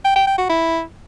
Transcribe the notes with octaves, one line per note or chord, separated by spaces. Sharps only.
G5
G5
G5
F#4
E4